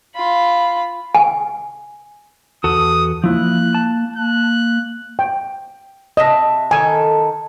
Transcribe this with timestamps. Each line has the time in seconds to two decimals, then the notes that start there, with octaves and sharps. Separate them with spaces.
0.15 F4 B5
1.15 G#5
2.64 E2 F#4 A4 D#6
3.24 F3 A#3 E4 F#6
3.74 A5
4.16 A#3 F#6
5.19 G5
6.17 C3 D#5 E5 A5
6.71 D#3 A4 G#5